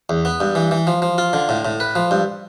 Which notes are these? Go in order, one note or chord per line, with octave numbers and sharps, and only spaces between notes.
E2
B3
G2
E3
E3
F3
F3
F4
D3
A2
A2
B4
F3
G2